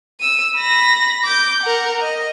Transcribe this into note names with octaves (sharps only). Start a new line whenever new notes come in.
E6 D#7
B5 A#6
D6 G6
A#4 F#5
D#5